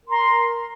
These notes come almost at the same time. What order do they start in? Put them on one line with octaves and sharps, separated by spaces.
A#4 C6 A#5